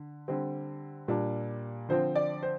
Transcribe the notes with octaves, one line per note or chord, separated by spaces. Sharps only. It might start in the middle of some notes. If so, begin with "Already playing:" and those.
Already playing: D3
D3 G3 C4
A#2 G3 D4
D3 F3 C4 C5
D5
C5